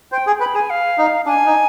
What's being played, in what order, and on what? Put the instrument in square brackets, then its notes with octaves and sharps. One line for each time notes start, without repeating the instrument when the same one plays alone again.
[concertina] C5 [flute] G5
[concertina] G#4
[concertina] B4 [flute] B5
[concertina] G#4 [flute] G#5
[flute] F5
[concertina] D#4
[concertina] D4 [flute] G#5
[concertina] D#4